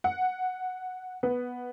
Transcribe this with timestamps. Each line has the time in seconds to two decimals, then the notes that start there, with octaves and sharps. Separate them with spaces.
0.04 F#5
1.23 B3